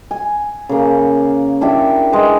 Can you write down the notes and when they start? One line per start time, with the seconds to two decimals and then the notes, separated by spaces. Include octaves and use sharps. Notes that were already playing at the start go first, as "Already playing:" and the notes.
0.11 G#5
0.69 C#3 A#3
1.61 D4 E4 G4 E5
2.12 G#3 B4